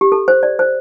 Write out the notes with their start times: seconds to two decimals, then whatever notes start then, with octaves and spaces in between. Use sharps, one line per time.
0.01 G4
0.12 A4
0.28 C5
0.43 D5
0.59 C5